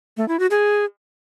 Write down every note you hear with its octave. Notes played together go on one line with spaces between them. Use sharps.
A3
E4
F#4
G#4